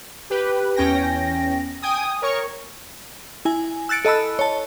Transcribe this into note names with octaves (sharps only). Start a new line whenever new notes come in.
G4 B4
E2 C#4 G5 A#6
G5 G#5 D#6
A#4 C#5 C#6
E4 G#5
E6 F#6 A6 C#7 D7
A4 D#5 A5 B5 E6
C#5 A5